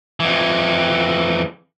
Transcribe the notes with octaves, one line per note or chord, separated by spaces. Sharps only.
F2 E3